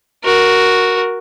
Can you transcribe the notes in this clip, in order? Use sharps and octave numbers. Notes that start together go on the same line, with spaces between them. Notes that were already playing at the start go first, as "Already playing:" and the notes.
F#4 A#4